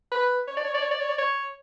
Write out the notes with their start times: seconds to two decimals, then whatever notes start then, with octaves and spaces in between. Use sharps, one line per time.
0.11 B4
0.48 C#5
0.57 D5
0.65 C#5
0.74 D5
0.82 C#5
0.91 D5
1.00 C#5
1.09 D5
1.18 C#5